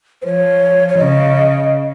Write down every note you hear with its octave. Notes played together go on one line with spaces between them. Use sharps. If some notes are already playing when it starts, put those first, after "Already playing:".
C5
F3 C#5
C#5
C#3 D#5